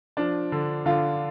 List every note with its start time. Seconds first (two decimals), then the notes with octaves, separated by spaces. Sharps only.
0.17 F3 D4
0.52 D3
0.86 D3 F4